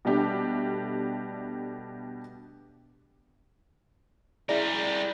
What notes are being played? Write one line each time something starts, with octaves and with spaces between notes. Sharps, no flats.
B2 G3 A3 D4 G4
G3 E4 G#4 A#4 D5